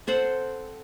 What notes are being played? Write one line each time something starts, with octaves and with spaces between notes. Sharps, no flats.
C4 A4 C5 F#5